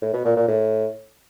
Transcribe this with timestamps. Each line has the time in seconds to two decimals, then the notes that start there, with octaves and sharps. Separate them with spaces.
0.02 A2
0.13 B2
0.25 A#2
0.37 A#2
0.48 A2